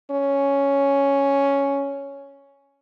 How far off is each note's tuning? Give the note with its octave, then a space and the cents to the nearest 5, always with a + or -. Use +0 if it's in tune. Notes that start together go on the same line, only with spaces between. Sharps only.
C#4 +5